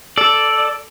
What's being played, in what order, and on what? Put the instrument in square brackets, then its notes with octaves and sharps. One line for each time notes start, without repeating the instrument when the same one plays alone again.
[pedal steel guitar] A4 [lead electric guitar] D5